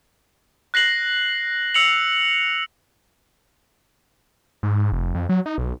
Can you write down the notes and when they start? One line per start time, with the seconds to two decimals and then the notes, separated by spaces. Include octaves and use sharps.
0.74 F#6 A#6 C7 F#7
1.74 E6 C#7 F7 F#7
4.63 G#2
4.92 F1
5.15 F2
5.29 F#3
5.46 D#4
5.58 B1